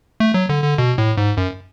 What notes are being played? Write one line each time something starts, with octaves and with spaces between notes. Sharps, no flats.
A3
F#3
D3
D3
B2
A2
G#2
F#2